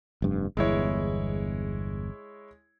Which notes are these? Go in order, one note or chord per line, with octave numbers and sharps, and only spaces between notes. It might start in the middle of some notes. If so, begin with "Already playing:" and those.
F1 G2
G1 E2 G#3 E4 C#5